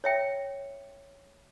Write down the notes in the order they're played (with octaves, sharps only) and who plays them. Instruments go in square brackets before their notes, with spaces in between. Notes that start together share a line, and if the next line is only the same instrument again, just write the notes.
[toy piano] C#5 E5 G5